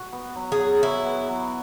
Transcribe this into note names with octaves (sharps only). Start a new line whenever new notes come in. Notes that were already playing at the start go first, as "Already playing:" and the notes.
Already playing: F#4
B3
F#3
G#4
F#3
E4 F#4
B3
F#3